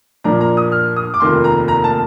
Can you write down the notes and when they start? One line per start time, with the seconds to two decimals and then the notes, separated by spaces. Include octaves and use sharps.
0.24 A#2 F3 A#3 D4 A#5
0.41 A#5
0.57 D#6
0.72 F6
0.96 D#6
1.14 D6
1.20 F1 D#2 D#3 A#3 F4 C6
1.44 A#5
1.68 A#5
1.84 A5